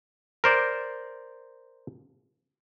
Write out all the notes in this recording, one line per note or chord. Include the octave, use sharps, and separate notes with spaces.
A#4 C5 D5